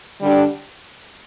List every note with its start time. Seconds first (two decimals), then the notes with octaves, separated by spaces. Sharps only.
0.20 D3 G3 D4 G4